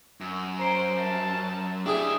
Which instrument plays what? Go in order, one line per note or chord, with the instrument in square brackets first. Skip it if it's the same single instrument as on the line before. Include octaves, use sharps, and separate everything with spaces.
[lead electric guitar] F#2
[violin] C5 [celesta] A#5 C7 D7
[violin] A5
[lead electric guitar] D4 E4 [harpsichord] G4 G#4 [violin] E5